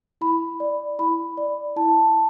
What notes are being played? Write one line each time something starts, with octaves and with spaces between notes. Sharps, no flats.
E4 B5
D5
E4 B5
D5
E4 A5